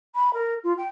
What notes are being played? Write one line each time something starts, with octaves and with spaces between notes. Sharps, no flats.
B5
A#4
F4
G5